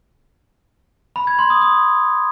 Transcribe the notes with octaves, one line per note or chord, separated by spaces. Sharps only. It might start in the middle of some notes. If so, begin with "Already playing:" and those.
B5
G#6
C6
D#6
D#6